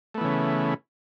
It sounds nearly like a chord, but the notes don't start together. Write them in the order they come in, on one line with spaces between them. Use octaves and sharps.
A3 B3 E3 C#3